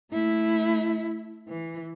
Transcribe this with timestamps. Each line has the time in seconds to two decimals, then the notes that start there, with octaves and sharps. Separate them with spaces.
0.11 A3 E4
1.48 E3